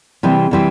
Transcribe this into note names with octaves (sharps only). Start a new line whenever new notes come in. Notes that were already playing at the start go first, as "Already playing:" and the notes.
C3 E3 G3 C4
C3 E3 G3 C4